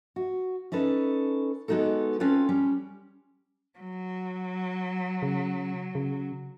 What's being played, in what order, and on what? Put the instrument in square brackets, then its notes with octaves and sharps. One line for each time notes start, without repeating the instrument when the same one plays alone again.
[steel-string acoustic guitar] F#4
C#4 D#4 A4 B4
G#3 B3 D#4 F#4 A4
C4 C#4 F4 A4 B4 C#5
G3 C#4
[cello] F#3
[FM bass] C#3
C#3